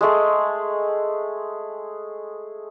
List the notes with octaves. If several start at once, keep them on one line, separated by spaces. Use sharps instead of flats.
G#3 A3 G#4